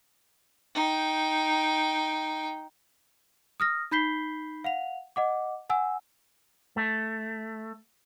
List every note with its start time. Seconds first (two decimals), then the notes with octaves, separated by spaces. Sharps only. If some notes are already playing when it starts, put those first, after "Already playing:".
0.75 D#4 G5
3.60 D#6 F6 A#6
3.91 D#4 B5 G6 B6 C7 G7
4.64 F5 F#5 F7
5.16 D#5 F#5 D6
5.70 F#5 G#5 E6
6.77 A3